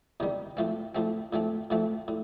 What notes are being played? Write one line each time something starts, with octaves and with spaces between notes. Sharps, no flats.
E2 C3 D#3 G3
A2 F3 A3 C4
A2 F3 A3 C4
A2 F3 A3 C4
A2 F3 A3 C4
A2